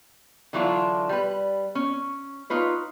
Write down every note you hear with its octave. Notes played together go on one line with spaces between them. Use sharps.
D3 E3 F#3 D4 E4 F4
G3 B4
C#4
D#4 F4 B4 C#5